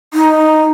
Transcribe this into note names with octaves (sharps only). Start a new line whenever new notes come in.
D#4